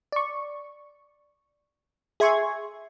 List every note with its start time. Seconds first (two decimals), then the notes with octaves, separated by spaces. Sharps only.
0.12 D5 C#6
2.20 G#4 E5 G#5 C6 C#6 G#6